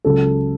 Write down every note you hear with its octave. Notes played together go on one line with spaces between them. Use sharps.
C#2 C#3 F#3 A4